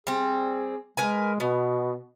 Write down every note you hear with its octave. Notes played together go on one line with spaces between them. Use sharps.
G3 C4 G#4
G#3 A#4 B4 G#5
B2 B3